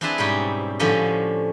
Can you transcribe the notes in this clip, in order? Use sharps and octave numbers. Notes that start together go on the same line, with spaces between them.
C4 D4 E4 G#4 B4 A5
G#2 B2 G3 C4 C#4 G4
A2 D3 F3 C#4 G4 D#5